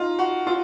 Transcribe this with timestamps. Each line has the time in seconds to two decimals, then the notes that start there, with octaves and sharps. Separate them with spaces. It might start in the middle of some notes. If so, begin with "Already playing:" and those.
Already playing: D#4 F4
0.19 F#4
0.47 F4